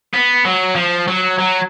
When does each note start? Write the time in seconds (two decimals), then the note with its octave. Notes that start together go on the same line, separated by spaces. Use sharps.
0.14 B3
0.45 F#3
0.76 F3
1.08 F#3
1.39 F#3